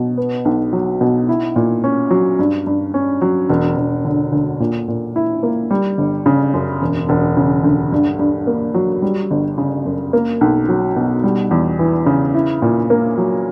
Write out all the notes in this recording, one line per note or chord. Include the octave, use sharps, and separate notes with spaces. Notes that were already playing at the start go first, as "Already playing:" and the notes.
Already playing: B2 F#3
B3
B1
F#3
B2
E4
A#2
C#4
F#3
G2
G2
C#4
F#3
E1
E1
D3
D2
A#2
A#2
E4
A#3
G3
G1
C#3
F#2
E1
E1
C#3
D2
G2
G2
A#3
F#3
G3
G1
C#3
F#2
A#3
B1
F#3
B2
G3
E2
E3
C#3
E4
A#2
A#3
F#3